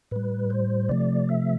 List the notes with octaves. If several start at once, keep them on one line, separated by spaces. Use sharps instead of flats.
A2 G3 B4
C5
C3 F3 A3 D5
E5